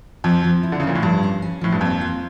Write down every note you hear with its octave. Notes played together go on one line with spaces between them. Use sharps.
F2 F3
F3
E4
D3
C#3
A#2 F3
A2
G2 F3
C#4
C#4
A2 F3
G2
F2 A#3
F4